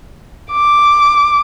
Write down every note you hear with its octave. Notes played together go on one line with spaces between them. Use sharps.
D6